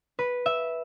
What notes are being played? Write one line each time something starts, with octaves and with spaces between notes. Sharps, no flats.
B4
E5